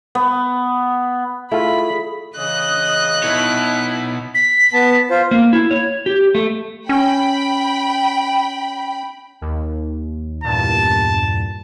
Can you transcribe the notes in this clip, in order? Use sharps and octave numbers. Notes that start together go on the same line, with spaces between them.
B3
A3 E4 F4 G#4 B5
C#3 E3 D#5 D#6 F#6
B2 D#4 E4 C#5
B6
B3 A5
F4 C5
A#3
E4
C#5
G4
A3
C#4 G5 B5
D#2
E2 G2 A#2 A5